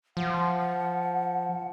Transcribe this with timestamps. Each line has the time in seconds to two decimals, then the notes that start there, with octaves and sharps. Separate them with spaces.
0.17 F3 F#5